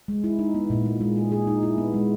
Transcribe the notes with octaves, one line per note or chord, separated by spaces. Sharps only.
G#3
E4
D#4
B3
A#2
A#3
G#3
G#4
G#4
D#4
E4
B3
G#3